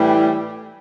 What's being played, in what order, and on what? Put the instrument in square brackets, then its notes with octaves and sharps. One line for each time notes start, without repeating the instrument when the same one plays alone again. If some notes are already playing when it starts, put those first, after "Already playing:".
Already playing: [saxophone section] A2 E3 G3